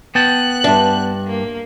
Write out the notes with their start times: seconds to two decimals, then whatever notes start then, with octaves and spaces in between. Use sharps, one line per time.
0.15 B3 G5 A5 F#6
0.64 G2 D4 E5
1.26 A#3